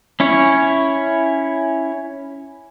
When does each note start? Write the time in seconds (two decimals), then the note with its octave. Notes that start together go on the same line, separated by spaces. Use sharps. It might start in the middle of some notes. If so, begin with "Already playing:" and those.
0.20 C#4 E4 C#5